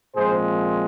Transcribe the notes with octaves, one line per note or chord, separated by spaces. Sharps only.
A#2 F3 G#3 C4 G#4 C5